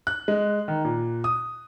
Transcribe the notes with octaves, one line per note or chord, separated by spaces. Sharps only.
F#6
G#3
D#3
A#2
D#6